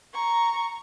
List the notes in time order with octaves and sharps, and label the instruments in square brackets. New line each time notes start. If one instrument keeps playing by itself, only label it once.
[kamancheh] A#5 C#6